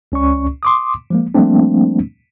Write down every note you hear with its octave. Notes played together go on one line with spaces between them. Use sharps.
C#2 C#4 D5 C#6
C6 D6 D#6
F3 G#3 A#3
F3 G3 A3 A#3 C4 D4